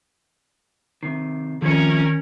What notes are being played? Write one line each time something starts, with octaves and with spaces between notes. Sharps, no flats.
C3 D#3 C7
C3 D#3 F3 C#4 A#4 G#6 C#7